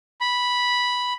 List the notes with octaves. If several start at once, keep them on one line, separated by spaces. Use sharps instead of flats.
B5